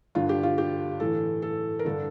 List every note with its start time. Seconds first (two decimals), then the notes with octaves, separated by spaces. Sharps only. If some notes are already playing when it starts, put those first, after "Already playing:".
0.15 G2 D3 F4
0.29 G4
0.43 F4
0.58 G4
1.00 A2 E3 A4
1.42 A4
1.79 A#4
1.85 G2 D3 A4